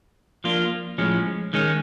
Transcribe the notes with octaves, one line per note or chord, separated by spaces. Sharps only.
F3 A#3 D4 F4
A2 F3 G#3 C#4
D#3 G#3 C#4